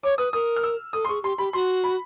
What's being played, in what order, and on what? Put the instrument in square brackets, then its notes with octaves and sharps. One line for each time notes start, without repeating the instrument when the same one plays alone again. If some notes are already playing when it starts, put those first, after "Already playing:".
[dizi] C#5 [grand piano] D6
[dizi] B4 [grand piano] D#6
[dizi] A#4 [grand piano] D#6
[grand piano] F6
E6
[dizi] A4 [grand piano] D#6
[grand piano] C6
[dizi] G#4 [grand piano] C#6
[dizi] G4 [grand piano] C6
[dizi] G4 [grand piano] B5
[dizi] F#4 [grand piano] C6
[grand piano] B5